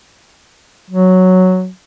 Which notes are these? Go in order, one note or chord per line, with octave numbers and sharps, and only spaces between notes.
F#3